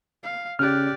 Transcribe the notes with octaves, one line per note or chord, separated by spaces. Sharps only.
F5
C#3 G4 D5 F6 F#6